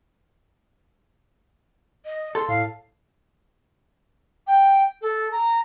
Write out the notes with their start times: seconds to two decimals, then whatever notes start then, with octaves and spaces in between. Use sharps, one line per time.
2.06 D#5
2.35 A4 C6
2.48 A2 F5
4.47 G5
5.02 A4
5.32 A#5